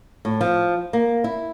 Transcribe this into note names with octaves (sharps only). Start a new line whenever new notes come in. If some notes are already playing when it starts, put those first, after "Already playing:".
A2
F3
A#3
E4